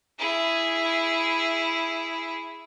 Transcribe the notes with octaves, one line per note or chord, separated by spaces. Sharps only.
E4 G#4